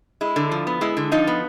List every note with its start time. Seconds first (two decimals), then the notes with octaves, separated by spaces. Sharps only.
0.21 G#3 E4
0.36 D3
0.52 F3
0.67 B3
0.81 G#3 E4
0.97 D3
1.12 F3 D#4 F4
1.27 B3